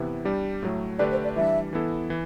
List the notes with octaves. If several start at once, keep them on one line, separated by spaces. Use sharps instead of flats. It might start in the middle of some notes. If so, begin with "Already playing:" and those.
Already playing: C3 E3 B3 E4
G3 D4 G4
A2 F#3 A3
D3 A3 D4 G4 B4 D5
C5
D5
E3 G3 D4 E5
E3 B3 E4 A4
E3